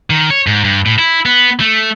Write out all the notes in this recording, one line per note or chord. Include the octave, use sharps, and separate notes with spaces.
D#3
C#5
G#2
G2
A2
E4
B3
A3